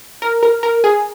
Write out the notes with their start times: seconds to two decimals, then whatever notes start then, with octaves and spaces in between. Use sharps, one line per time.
0.22 A#4
0.43 A#4
0.63 A#4
0.84 G#4